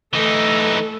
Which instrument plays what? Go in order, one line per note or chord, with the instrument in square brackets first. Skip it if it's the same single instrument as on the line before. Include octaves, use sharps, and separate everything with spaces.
[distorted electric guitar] E3 D#4 [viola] A3 A4